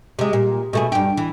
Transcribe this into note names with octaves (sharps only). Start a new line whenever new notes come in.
C3 G#3
A#2
B2 A3 G#4
G2 G4
E3